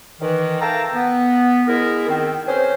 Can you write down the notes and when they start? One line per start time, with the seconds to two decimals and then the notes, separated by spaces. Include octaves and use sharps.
0.20 D#3 E3
0.61 A4 E5 F5 G5 A5 A#5
0.93 B3
1.67 G#3 B3 E4 G#4 A#4
2.08 D#3 C4
2.47 C#4 G#4 B4 C5